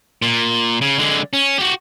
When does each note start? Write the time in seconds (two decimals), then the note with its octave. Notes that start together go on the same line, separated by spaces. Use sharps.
0.22 A#2
0.81 C#3
0.98 D3 G#3
1.33 C#4
1.58 F#4 G4